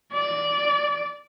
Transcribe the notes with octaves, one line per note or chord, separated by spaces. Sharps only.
D5